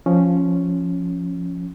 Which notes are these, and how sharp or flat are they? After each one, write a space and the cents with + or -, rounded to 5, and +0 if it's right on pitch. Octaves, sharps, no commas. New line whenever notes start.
F3 +0 C#4 +0